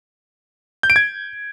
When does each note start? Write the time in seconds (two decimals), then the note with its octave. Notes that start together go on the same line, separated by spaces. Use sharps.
0.83 G6
0.90 D7
0.96 G#6